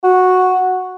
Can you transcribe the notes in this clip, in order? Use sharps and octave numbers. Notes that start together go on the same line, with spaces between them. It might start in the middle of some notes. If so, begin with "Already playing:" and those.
F#4